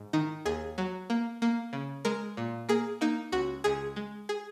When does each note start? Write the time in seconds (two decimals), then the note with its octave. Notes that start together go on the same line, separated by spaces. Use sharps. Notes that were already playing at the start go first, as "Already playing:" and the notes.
Already playing: G#2
0.13 D#3 D#4
0.45 D#2 G#4
0.78 F#3
1.10 A#3
1.42 A#3
1.73 C#3
2.05 G#3 A#4
2.37 A#2
2.69 A#3 G#4
3.01 A#3 D#4
3.32 C#2 F#4
3.64 C#2 G#4
3.96 G#3
4.29 G#4